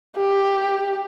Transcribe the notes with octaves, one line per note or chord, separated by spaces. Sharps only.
G4